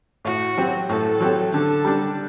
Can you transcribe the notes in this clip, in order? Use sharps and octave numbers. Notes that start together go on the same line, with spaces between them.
A2 F#4
F#3 C4 G4
A2 A4
F#3 C4 G4
D3 A4
G3 D4